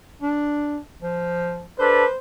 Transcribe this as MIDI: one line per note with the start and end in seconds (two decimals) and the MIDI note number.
0.21 0.78 62
1.02 1.64 53
1.79 2.05 62
1.79 2.05 69
1.79 2.05 71
1.79 2.18 72